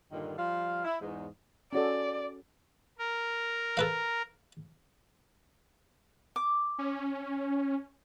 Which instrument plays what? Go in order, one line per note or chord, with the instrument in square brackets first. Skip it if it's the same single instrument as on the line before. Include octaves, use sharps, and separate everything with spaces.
[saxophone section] G2 A#2 D3 D#3
F3 G3 F5
E4
E2 G#2
[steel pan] C#4 F#4 A4 [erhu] D5
[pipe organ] A#4
[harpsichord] A4 B4 F5
[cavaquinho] D6
[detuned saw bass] C#4